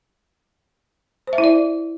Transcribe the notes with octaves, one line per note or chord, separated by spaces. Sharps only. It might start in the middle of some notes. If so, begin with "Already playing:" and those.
C5
E5
E4
D5